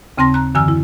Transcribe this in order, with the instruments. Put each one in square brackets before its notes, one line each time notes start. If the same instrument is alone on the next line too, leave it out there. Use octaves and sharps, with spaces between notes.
[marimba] D#2 C#3 C4 A5 C6 A#6
A#5 F#6
F#2 D3 E3 G#5 E6 F6
E4